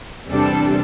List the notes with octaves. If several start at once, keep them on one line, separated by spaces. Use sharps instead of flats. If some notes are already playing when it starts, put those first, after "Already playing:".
E2 C3 G3 D4 A4